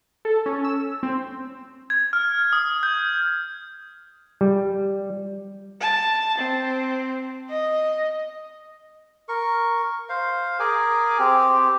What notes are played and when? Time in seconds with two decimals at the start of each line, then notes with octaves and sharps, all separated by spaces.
0.25 A4
0.46 C#4
0.64 E6
1.03 C4
1.90 G#6
2.13 F6
2.53 D#6
2.83 G6
4.41 G3
5.81 A5
6.38 C4
7.50 D#5
9.29 A#4 C#6
10.09 C5 F5
10.59 G#4 A#4 G#5 D6
11.19 C4 G4